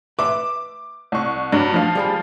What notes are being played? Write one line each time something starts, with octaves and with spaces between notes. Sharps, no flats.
B4 E5 C6 D6
C2 C#6
G2 F#3 D4
F3 F5
G3 G#4 B5